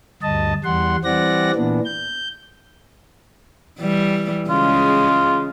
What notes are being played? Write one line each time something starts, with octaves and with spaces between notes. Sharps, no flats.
D2 G2 D#5 A5
E2 G3 F#5 C6
E3 G3 C4 D5 F#5 A#6
A#2 E3 B3 D4
G6
E3 G3
C#3 G#3 F4